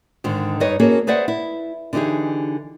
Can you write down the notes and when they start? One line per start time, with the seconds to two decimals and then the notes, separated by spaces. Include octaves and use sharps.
0.24 G#2 D3 D#3
0.60 G2 D#4 B4 C#5 D#5
0.80 A#3 C#4 F#4 G#4 A4
1.07 G#4 B4 C5 D5 E5 F#5
1.28 E4
1.93 D3 E3 D#4 G4 G#4